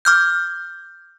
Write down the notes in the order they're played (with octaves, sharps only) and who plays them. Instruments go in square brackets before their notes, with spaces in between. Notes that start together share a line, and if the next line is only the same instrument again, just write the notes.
[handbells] D6 F6 G6